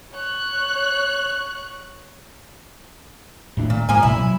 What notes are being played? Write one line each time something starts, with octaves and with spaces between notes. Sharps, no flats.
C#5 F#6
D#1 A2 D4
A#2
G#2 F3 G#3 A#3 G#5
A1 B2 A#3 E4
F#3